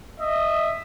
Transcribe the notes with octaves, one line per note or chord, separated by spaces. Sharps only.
D#5 E5